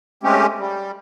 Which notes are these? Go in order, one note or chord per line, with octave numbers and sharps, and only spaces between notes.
G#3 A3 C4 C#4 G4
G3